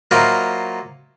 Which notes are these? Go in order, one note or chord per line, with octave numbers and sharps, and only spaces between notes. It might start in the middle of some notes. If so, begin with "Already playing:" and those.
F#3 A#3 E4 F4 C5 D#5